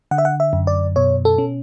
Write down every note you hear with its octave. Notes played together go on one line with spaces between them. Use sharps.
D3 F#5
E5
F#5
E5
F#2
D5
B2 C#5
A4
C#4